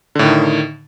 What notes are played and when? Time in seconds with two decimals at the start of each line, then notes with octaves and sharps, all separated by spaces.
0.15 D3
0.19 A2
0.23 D#3